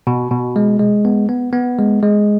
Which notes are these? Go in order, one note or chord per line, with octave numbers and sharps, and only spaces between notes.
B2
B2
G#3
G#3
B3
B3
B3
G#3
G#3